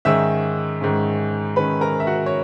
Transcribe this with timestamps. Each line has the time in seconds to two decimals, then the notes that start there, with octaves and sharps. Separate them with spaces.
0.05 G#2 D#3 G#3 C#4 E5 E6
0.81 G#2 D#3 G#3 C#4
1.56 G#2 D#3 G#3 C#4 B4 B5
1.81 A#4 A#5
2.00 E5
2.07 F#4 F#5
2.26 C#5